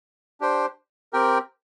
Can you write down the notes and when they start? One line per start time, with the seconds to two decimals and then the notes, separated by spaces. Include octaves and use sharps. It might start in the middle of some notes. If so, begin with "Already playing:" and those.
0.41 D4 G4 C5 G5
1.13 C4 G4 A#4 G5